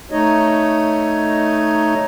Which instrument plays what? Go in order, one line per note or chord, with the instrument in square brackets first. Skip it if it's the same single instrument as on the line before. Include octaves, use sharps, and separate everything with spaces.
[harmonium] A3 D#4 C#5 D#5